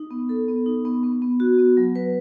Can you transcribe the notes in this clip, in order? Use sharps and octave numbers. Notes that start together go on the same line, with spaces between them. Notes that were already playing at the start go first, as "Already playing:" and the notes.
Already playing: D#4
B3
A4
B3
D#4
B3
B3
B3
F#4
B3
F#3
B4